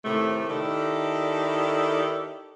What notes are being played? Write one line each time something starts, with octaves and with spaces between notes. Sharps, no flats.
A2 C3 D#3 A3
D#3 E4 G4 A4 D5